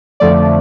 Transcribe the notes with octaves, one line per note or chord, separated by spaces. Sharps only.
F2 D3 F3 A3 D5